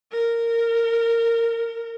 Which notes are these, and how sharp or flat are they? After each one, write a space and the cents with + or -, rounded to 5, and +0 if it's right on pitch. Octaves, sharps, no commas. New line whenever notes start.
A#4 -15